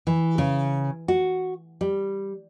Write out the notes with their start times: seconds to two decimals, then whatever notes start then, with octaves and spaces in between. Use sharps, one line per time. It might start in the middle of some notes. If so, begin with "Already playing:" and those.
0.07 E3
0.38 C#3
1.08 F#4
1.81 G3